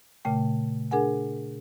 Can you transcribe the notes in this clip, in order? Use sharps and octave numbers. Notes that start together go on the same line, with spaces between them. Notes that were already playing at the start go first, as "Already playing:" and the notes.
A#2 C#3 A3 G5
D4 G#4 A#4 F#5 G#5